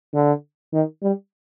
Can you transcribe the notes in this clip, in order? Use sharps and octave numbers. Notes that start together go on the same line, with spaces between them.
D3
D#3
G3